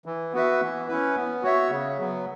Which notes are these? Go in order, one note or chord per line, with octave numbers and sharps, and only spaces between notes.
E3
B3 F#4 B4 E5
E3
C#4 E4 B4
B3
F#4 C#5 E5
C#3
F#3 B3